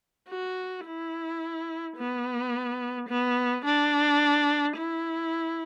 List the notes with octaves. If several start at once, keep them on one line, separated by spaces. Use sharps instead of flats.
F#4
E4
B3
B3
D4
E4